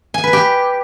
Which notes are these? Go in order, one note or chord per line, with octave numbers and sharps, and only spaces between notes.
G#5
B4
G4